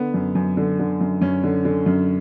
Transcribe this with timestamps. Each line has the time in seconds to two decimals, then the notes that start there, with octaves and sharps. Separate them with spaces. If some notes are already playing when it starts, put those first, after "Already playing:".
Already playing: D3 B3
0.14 F#2
0.35 F#2
0.57 D3
0.79 D3
1.01 F#2
1.21 F#2 C#4
1.44 D3
1.65 D3
1.86 F#2